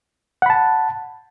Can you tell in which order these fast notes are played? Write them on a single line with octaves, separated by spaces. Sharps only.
F#5 B5 A5